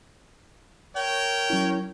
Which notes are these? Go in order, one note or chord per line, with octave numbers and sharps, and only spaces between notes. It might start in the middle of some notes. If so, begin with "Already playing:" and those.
A#4 C#5 G5
F#3 C#4 E4